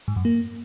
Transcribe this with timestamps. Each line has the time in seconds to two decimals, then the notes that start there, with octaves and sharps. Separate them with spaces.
0.08 G#2
0.16 F#2
0.25 A#3